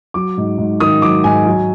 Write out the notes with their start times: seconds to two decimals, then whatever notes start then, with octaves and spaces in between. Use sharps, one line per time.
0.14 F#3 D6
0.37 G#2
0.58 G#2
0.80 D#3 D#6
1.02 F#3 D6
1.24 G#2 G#5
1.47 F#3